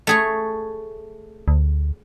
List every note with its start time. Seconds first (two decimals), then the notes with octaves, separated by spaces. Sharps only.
0.07 A3 G#4 C#5
1.48 D2